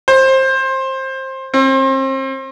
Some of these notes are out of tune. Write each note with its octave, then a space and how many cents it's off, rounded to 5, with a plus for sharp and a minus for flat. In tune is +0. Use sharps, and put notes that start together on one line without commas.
C5 +20
C4 +35